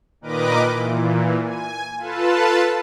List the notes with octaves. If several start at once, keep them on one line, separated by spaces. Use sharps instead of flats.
A#2 D#3 A#4 B4 D#5 D6
A#2 E3
G#5
F4 A4 B4 A5